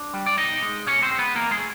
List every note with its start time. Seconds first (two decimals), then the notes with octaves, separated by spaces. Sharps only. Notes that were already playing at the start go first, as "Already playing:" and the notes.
Already playing: D4
0.14 G3
0.26 D5
0.38 B2 D#4 D#5
0.63 G#3
0.86 B2 C#4 C#5
1.03 C4 C5
1.11 G#3
1.19 B3 B4
1.35 E2 A#3 A#4
1.51 G#3 G#4
1.59 A3